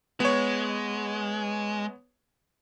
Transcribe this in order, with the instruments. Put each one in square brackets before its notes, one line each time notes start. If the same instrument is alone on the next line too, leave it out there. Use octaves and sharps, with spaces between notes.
[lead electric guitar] G#3 [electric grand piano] B3 C#5